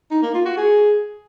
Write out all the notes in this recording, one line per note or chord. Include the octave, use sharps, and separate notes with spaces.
D#4
A#3
F4
F#4
G#4